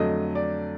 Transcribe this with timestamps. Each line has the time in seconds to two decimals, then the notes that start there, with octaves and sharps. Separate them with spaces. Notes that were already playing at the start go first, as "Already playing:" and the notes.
Already playing: F2 D3 F#3 A3 D#5
0.35 D5